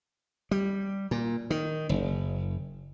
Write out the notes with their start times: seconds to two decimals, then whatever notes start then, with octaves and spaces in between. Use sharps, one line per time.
0.51 G3
1.11 A#2
1.50 D#3
1.89 F#1